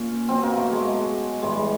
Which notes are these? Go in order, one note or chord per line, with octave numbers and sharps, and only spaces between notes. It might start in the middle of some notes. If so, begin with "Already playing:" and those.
Already playing: A#2 C#4
B2 F#3 C4
A#3
A3
G#3
A2 E3 G3 G#3
G#3